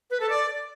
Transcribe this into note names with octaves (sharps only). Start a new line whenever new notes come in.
B4
A4
D5